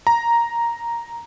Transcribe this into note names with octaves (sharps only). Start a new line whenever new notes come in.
A#5